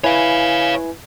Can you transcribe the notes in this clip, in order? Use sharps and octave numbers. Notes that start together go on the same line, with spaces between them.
E4 B4 C#5 F5 G#5